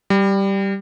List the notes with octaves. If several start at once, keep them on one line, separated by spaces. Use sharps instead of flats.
G3